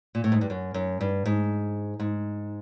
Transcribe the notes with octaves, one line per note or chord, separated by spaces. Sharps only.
A#2
A2
G#2
G2
F#2
F#2
G2
G#2
G#2